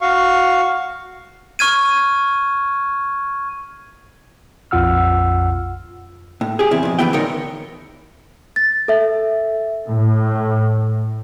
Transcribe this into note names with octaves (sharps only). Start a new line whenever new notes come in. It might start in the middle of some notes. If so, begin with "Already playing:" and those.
F#4 F5 C#6
C#6 F6 G#6 D#7
A#1 F2 F4 F#5 E6 F6
A2
G4 G#4
E2 C3 E4
F2 B2
F2 E3 B3 E4 G5
D2 A#2 D#4 A#4 C#5
A6
A4 E5
A2